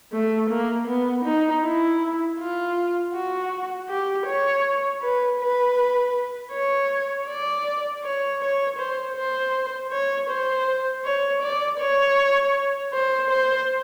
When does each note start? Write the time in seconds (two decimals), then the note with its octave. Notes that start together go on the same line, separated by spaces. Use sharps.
0.12 A3
0.50 A#3
0.87 B3
1.25 D#4
1.63 E4
2.38 F4
3.13 F#4
3.89 G4
4.26 C#5
5.02 B4
5.40 B4
6.52 C#5
7.28 D5
8.03 C#5
8.41 C#5
8.78 C5
9.16 C5
9.92 C#5
10.29 C5
11.04 C#5
11.42 D5
11.79 C#5
12.93 C5
13.30 C5